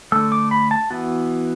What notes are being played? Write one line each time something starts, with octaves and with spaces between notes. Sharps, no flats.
D3 A3 E6
D6
B5
A5
E3 B3 F#4